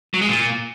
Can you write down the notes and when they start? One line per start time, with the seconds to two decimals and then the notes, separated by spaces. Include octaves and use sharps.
0.14 F#3
0.21 G#3
0.29 A#2